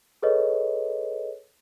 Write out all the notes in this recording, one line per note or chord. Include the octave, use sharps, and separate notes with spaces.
G#4 A4 B4 C#5 D#5